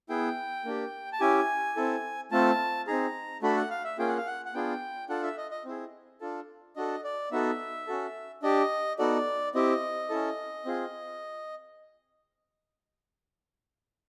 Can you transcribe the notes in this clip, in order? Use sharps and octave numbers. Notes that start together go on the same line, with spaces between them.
B3 E4 G#4 G5
A#3 D4 G4
A5
C#4 E4 G4 G#5
C4 E4 A4
A3 C4 F4 A4 A5
C4 D#4 G#4 A#5
A3 D4 F#4 A4 B5
F#5
F5
E5
A#3 C#4 F4 G#4 G5
F#5
F5
F#5
F#5
B3 D4 F4 G#4 G5
D4 F4 A4 F#5
E5
D#5
D#5
C4 E4 G#4
D4 F4 A4
D4 F#4 A4 D#5
D5
B3 D#4 F#4 A4 E5
C#4 F#4 A4
D4 G4 D#5
B3 D#4 F#4 A4 D5
C4 E4 G4 D#5
C#4 E4 A4
C4 F4 G#4